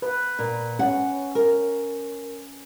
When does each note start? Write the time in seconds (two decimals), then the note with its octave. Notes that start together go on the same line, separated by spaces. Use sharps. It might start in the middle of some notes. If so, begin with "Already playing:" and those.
0.02 B4
0.39 A#2
0.79 C#4 F#5
1.35 A#4